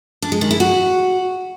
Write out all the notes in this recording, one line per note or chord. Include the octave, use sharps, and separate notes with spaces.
D4
G#3
D#3
E4
F#4